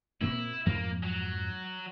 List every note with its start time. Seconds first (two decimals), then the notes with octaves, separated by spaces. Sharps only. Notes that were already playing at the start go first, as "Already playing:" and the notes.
0.21 A#2 A#3 C4 E4
0.66 F2 G#2 F3 A#3
1.03 F#3